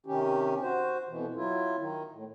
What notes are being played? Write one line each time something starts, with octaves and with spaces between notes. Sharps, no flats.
C3 D#3 C#4 G4
F#4 C5
F2 B2 E3
F#3 E4 F4
D#3
A2